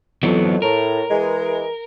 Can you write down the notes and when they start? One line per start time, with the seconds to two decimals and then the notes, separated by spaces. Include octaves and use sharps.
0.23 F2 E3 F#3 B3
0.62 A2 A#4
1.10 E3 G#3